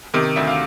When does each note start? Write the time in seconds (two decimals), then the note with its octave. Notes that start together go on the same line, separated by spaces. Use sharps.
0.14 C3 D#3
0.36 D2 E5
0.47 F5